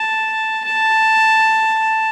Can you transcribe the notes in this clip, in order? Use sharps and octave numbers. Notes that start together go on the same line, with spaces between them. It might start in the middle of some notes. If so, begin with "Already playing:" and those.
Already playing: A5
A5